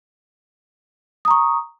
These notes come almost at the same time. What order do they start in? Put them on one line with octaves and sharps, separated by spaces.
D#6 A#5 C#6